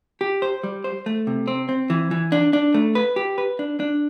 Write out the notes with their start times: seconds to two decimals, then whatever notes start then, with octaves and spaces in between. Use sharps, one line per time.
0.21 G4
0.42 C5
0.63 G3
0.84 C5
1.06 A3
1.27 C3
1.48 C4
1.69 C4
1.90 E3
2.11 E3
2.32 D4
2.53 D4
2.74 A3
2.95 B4
3.16 G4
3.38 B4
3.59 D4
3.80 D4